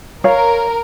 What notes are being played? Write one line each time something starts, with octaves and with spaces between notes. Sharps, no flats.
A#4 C#5 F5